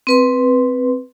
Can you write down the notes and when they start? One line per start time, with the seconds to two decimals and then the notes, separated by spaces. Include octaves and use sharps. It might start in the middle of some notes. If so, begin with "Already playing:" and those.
0.07 C4 B4 C6